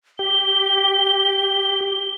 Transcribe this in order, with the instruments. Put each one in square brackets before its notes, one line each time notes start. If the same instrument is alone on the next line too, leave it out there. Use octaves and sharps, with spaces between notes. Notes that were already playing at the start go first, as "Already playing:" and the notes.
[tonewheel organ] G4 [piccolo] G7